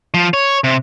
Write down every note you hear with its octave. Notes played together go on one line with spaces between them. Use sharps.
F3
C#5
C3